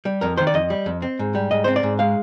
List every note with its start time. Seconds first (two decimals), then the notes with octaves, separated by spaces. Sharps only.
0.05 G3
0.21 F2 A#4
0.37 D#3 C5
0.47 D5
0.54 F2 D#5
0.70 G3
0.86 F2
1.02 C4
1.19 G#2
1.35 G3
1.51 G#2 D#5
1.64 C4 C5
1.76 D5
1.83 G#2
1.99 G#3 F5